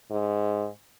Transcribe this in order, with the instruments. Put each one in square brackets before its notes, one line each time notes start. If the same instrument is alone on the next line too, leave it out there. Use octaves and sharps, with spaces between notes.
[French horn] G#2